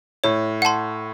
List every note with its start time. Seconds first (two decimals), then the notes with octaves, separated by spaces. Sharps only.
0.24 A2 C#5
0.62 F#5 A5 C6